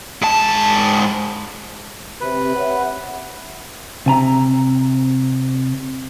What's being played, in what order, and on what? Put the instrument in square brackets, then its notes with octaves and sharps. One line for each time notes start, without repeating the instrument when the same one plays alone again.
[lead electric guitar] G#2 A5
[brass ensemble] C3 [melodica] B4
[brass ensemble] C#5 E5 F#5
[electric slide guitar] C3 G#5 A#5